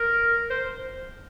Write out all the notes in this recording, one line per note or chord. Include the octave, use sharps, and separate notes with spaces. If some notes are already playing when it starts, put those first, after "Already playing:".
Already playing: A#4
C5